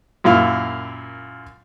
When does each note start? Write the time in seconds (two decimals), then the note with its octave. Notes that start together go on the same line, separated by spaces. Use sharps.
0.24 F#2 A#2 E4 F5